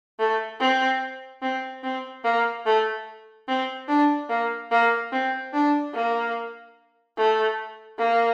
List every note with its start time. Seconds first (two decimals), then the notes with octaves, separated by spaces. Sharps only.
0.19 A3
0.60 C4
1.42 C4
1.83 C4
2.24 A#3
2.65 A3
3.48 C4
3.88 D4
4.29 A#3
4.71 A#3
5.12 C4
5.53 D4
5.94 A#3
7.17 A3
7.99 A#3